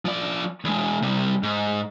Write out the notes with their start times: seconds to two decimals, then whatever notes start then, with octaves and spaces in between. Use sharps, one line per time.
0.05 F3 D5
0.65 E2 G#3
1.02 C3 G3
1.43 G#2